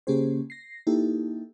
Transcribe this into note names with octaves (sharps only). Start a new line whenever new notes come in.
C#3 A#3 C#4 G4 G#4 C5
A#6 C7
A#3 D#4 E4 G4 A4